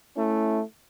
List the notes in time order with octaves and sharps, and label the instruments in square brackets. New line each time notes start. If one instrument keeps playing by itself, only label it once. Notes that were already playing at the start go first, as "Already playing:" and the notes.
[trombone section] A3 C#4 E4